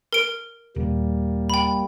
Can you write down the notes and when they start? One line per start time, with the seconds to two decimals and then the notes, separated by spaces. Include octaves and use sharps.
0.12 A#4 D7
0.76 D#1 G3 A#3
1.50 G5 B5